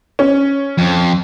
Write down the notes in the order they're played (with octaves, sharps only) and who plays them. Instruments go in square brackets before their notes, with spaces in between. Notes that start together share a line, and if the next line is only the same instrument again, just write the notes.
[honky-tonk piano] C#4
[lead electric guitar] F2